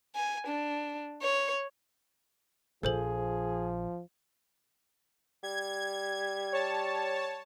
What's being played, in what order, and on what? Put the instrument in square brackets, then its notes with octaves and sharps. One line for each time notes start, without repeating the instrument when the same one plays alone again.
[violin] G#5
D4
C#5
[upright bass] A#1 [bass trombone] F3 [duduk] G#4 [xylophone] A4 C5 F#7
[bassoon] G3 [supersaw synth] G#6
[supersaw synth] C#5 A5